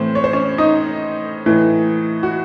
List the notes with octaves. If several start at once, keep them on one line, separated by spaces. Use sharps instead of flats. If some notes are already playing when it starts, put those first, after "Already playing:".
Already playing: A2 E3 C4 C5
C#5
C5
C#4 C#5
D#4 D#5
A2 E3
F#4